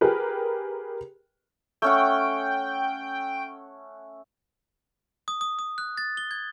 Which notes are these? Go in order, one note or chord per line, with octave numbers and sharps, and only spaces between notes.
G4 G#4 A#4 B4
A3 C#4 F#5 G5
D#6
D#6
D#6
F#6
A6
G7
G#6